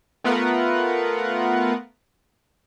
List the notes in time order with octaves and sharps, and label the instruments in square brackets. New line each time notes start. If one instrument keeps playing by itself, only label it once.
[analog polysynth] A3 B3 F4 A#4 B4 F#5